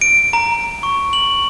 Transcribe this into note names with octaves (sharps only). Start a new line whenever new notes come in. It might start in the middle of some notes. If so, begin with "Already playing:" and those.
D7
A#5
C#6
F#7